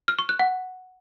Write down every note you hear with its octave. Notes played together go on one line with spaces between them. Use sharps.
F6
C#6
F#6
F#5